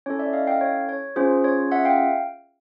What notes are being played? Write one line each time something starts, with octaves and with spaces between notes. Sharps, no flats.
C#4 E4 A4 C#5
D5 E5
D#5 F5
F5 G5
C#5
C#5
C#4 F4 G#4 C5
C#5
E5 F#5
F5 G5